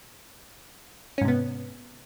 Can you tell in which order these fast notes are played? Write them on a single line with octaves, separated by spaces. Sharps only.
C#4 G#2 C3 B3